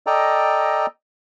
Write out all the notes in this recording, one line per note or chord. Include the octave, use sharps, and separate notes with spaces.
A4 D5 D#5 G5 A#5